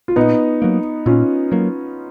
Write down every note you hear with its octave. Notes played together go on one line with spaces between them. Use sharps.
F4
A#2 B3 D#4
F#3 A#3
A#2 C#4 F4
F#3 A#3